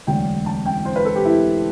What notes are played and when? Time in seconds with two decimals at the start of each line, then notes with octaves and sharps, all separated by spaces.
0.07 E1 D2 D3 F#3 G5
0.46 A5
0.66 G5
0.85 C5
0.96 B4
1.05 A4
1.16 G4
1.25 E4